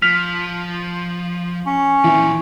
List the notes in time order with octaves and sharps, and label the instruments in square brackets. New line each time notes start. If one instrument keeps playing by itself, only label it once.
[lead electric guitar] F3 [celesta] F6 B6 F7
[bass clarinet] C#4
[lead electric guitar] A#2 D3 [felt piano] E3